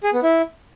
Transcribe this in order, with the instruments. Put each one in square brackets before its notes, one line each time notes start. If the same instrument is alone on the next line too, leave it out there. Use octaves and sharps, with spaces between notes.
[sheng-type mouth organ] G#4
B3
E4